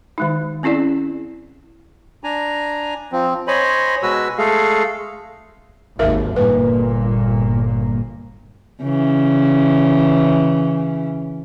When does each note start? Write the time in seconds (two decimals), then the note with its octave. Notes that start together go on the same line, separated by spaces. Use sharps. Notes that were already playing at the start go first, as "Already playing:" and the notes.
0.18 D#3 G#3 D#4
0.63 C4 C#4 E4 G#4 D5
2.24 D4 G#5 A#5
3.12 F3 C4
3.48 C5 C#5 D#5 G#5 B5
4.03 B2 G#3 F#4 B4 G#5 E6
4.38 G#3 A3 G#4 A4 F5
5.99 G#1 D#2 A#4 E5 F5
6.36 G1 A#2 A#3 B4
8.83 C#3 E3